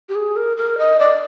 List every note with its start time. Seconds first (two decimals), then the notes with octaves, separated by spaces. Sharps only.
0.09 G4
0.15 G#4
0.36 A#4
0.57 A#4
0.78 D#5
0.99 D5